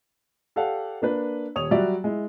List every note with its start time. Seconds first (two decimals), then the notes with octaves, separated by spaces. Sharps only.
0.56 G4 A4 D5 F5 F#5
1.02 A#3 D4 B4
1.55 D#1 C#5 D#6 F7
1.71 F#3 G3 F#4 D5 E5
2.04 G#3 E4